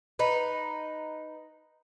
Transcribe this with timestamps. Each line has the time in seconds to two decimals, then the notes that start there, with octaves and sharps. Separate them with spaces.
0.19 D#4 B4